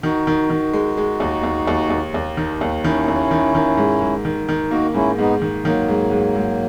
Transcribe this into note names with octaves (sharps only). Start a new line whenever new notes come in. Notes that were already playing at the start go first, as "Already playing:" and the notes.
D#3 D#4 F#4
D#3
D#3
G#3
G#3
D#2
D#2
D#2
D#2
D#2
D#3
D#2
D#3 C#4 E4
D#2
D#3
D#3
G#2
G#2
D#3
D#3
A#3 D#4 F#4
G#2 C#4 E4
G#2 B3 D#4
D#3
D#3 F#3 A#3
G#2
G#2
G#2